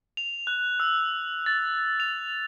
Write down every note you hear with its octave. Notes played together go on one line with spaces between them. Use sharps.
F7
F#6
E6
A6
F7